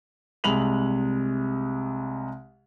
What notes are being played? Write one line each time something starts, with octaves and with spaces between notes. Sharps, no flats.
C2 C3 G#3 B5 F7 F#7